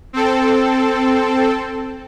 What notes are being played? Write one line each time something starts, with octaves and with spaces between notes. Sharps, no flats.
C4 A4